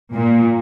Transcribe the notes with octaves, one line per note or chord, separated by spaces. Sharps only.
A#2